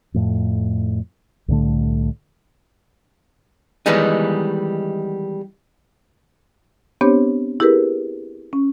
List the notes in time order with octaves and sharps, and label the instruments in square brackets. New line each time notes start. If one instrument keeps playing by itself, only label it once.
[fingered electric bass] F2 A2
C2 A2 D3 A3
[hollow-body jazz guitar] D#3 E3 G3 G#3 B3 D#4
[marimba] B3 C4 D4 G4 C5 C#5
E4 G4 G#4 A#4 B4
C#4